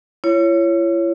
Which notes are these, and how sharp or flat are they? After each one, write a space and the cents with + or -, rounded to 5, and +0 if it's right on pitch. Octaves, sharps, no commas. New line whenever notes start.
E4 +45 C#5 +0